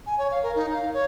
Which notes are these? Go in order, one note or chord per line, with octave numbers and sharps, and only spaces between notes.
G#5
C#5
F5
A#4
D#4
F5
C#5